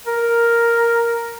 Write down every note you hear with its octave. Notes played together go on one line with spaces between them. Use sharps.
A#4